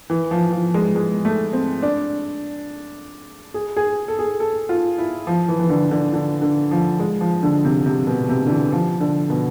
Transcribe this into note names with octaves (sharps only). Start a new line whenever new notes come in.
E3
F3
F3
G#3
G#3
A3
C4
D4
G#4
G#4
A4
G#4
A4
F4
E4
F3
E3
E3
D3
D3
D3
D3
F3
G#3
F3
D3
C3
C3
B2
C3
D3
E3
F3
D3
B2